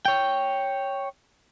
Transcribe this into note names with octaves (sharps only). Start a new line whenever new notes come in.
C#5 G5